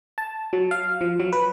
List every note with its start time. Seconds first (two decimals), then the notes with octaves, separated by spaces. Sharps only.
0.18 A5
0.53 F#3
0.71 F5
1.01 F3
1.20 F#3
1.33 B4